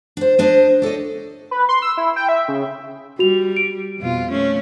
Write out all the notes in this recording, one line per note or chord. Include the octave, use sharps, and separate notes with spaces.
D4 C5
D4 C5 D#5
D4 A4 C#5 D#5
B4
C6
E6
E4
G5
E5
C#3
G3 F#4 F7
D7
F2 B2 F4
A3 C#4